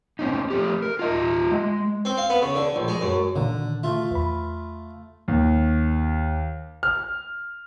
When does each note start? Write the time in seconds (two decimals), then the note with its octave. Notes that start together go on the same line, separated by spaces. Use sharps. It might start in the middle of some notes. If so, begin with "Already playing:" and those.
0.19 C4 C#4 D#4
0.50 A3 G4
0.82 A#4
0.99 F4 D#5 E5
1.51 G#3
2.05 C4
2.18 F5
2.30 B3
2.42 C#3
2.56 D3
2.76 A#1
2.88 G#3
3.01 F#2
3.36 A#2 D3 D#3
3.83 A3 F4
4.11 E2 B5
5.28 D#2
6.83 F6